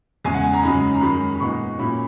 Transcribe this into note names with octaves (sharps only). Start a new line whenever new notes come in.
E2 C#3 G#3 G#5
F#5
G#5
A#5
F#2 C#3 G#3 D#4 B5
A#5
F#2 D#3 G#3 B5
B5
A#2 G#3 B3 D#4 C#6
A#2 F#3 C#4 E4 B5